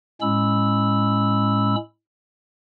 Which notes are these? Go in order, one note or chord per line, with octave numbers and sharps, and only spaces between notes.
A2 G#3 C#4 B5 E6